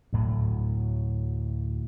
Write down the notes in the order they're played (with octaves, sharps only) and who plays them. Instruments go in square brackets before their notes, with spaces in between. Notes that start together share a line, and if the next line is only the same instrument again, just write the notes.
[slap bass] D2 A2 F#3